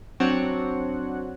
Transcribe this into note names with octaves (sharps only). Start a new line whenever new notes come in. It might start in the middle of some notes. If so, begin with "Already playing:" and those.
F#3 C4 D4 F#4 C#5 F#5